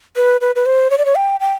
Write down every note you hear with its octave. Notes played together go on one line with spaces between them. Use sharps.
B4
B4
B4
C5
C#5
D5
C#5
G5
G5